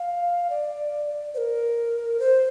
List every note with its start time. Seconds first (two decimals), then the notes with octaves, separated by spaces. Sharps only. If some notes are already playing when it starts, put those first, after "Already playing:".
Already playing: F5
0.50 D5
1.34 C5
1.38 A#4
2.20 C5